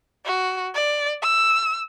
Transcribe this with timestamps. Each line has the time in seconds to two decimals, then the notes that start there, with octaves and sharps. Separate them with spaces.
0.25 F#4
0.75 D5
1.23 E6